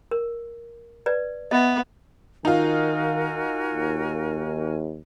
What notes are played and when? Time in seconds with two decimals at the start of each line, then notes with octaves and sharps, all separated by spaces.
0.11 A#4
1.06 B4 D5
1.51 B3 D#5 E5
2.45 D#3 D#4 F4 F#4 A#4 G#5
3.73 D#2